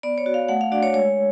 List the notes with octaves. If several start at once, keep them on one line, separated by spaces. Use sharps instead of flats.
B3 D5
C#5
F#4
F5
A3 F#5
F5
D4 F#4 D5
C#5
G#3 C#5